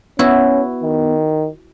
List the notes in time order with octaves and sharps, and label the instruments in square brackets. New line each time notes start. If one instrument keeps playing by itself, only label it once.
[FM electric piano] B3 [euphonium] C#4 [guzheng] E4 F#4
[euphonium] D#3